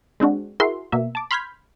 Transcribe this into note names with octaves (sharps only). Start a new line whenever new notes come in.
G#3 C4 D4 F#4
E4 F#4 G#4 A#4 E5 C6
B2 A#3 E5
A5 D6
B5 C6 F6 G6 G#6 B6